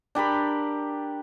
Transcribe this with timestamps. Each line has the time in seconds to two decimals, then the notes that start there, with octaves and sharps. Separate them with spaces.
0.15 D4 G4 A#4 B5